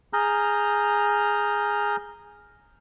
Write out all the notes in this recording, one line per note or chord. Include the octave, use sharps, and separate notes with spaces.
G#4 A#5 F6 G6